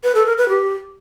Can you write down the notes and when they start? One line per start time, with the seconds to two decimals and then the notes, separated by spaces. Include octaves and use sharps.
0.04 B4
0.15 A4
0.26 A#4
0.38 B4
0.49 G4